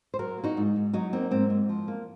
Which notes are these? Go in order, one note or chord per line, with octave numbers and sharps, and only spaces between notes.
C5
F#3 F#4 A#4
A#3
D#4 F#4
G#2
G#2
F#3 D#4 F#4
A#3 C4 D#4
G#2 C4
G#2
F3
A#3